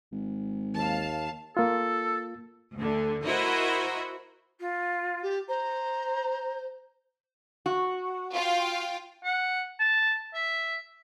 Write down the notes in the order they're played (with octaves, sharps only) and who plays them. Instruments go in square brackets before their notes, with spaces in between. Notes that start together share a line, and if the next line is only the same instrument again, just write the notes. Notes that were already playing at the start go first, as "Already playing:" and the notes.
[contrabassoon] G#1
[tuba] D#2 [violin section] F5 A5
[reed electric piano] A#3 F4 [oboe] A4
[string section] D2 D3
E4 F#4 A#4 C5 D#5 E5
[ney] F4
[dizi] G4
[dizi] C5 [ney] A#5
[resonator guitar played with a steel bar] F#4
[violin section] F4 F5 G5
[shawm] F#5
A5
E5